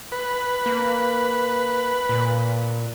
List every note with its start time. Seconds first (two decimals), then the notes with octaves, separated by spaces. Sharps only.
0.12 B4
0.66 A#3
2.09 A#2